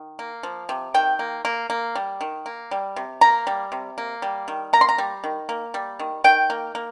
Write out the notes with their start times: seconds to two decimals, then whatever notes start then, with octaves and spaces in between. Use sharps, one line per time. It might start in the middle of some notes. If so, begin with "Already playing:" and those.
Already playing: D#3
0.19 A#3
0.43 F3
0.69 C3
0.94 D#3 G5
1.19 A#3
1.45 A#3
1.70 A#3
1.95 G3
2.21 D#3
2.46 A#3
2.71 G3
2.96 C3
3.21 A#3 A#5
3.47 G3
3.72 C3
3.98 A#3
4.22 G3
4.48 D#3
4.73 A#3 A#5
4.81 C6
4.89 A#5
4.98 G3
5.24 D#3
5.49 A#3
5.74 G3
5.99 D#3
6.24 D#3 G5
6.50 A#3
6.75 A#3